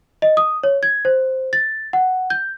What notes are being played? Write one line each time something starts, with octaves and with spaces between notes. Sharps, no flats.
D#5
D#6
C#5
G#6
C5
A6
F#5
G6